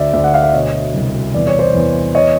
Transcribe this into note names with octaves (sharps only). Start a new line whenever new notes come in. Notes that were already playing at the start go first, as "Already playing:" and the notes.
Already playing: D2 D5 E5
D2 D5 E5
F#5
F5
E5
B2 C#5 D#5
C2
E2 D5
C#5
C5 D5
E2
C#5 D#5